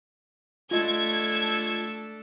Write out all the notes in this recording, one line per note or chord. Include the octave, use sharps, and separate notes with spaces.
A3 D4 F4 A4 D#5 G#6